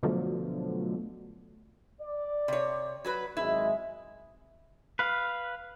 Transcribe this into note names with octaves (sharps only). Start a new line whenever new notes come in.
B2 D3 F3 F#3 A3
D5
C3 C#5
F#3 F#4 B4
G#1 F#2 G#3 E4
B4 F5